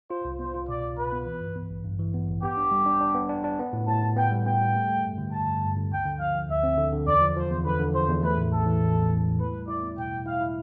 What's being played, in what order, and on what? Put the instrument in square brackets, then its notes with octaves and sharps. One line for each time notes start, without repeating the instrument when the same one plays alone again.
[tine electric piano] F4 [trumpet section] C5
[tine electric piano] C2
[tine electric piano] B3 [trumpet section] C5
[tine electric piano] F4
[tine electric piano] B2 [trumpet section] D5
[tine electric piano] C2
[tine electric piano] B2 [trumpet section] B4
[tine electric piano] B3
E3
G2
B3
A1
G2
E3
B3
A1
[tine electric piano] B3 [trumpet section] G4
[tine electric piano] D4
G3
D4
D4
B3
D4
D4
B3
A2
[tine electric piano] A2 [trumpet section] A5
[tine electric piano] A2
[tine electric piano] B3 [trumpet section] G5
[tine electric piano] G3
[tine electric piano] B3 [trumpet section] G5
[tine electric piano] G3
A3
A3
G2
D3
[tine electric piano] G2 [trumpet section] A5
[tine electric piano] G2
G2
D3
[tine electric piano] D2 [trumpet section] G5
[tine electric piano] D3
[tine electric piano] F3 [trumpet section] F5
[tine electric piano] F3
[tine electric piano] D2 [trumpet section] E5
[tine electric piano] C4
D3
D3
[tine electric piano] E2 [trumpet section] D5
[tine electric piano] F3
[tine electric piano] F3 [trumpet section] C5
[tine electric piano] E2
[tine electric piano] D3 [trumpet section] B4
[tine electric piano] D3
[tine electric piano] F3 [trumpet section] C5
[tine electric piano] E2
[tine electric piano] A3 [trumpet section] B4
[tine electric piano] A2
[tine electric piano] A1 [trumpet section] A4
[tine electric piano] E3
A2
E3
A2
A3
[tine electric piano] E4 [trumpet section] B4
[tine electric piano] G3
[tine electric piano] E4 [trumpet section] D5
[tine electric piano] B3
[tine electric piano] B2 [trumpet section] G5
[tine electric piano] B2
[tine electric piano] E4 [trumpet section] F5
[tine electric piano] E4